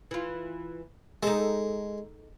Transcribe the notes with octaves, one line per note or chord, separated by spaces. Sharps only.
E3 F4
G#3 D#4 A4